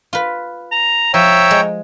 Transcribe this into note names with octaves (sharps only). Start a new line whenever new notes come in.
F4 B4
A#5
F3 C#5 E5 G5 A#5
G#3